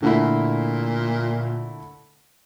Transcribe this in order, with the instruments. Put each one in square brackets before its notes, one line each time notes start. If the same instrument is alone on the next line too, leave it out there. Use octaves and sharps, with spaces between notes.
[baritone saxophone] A#2 [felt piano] D3 A3 E4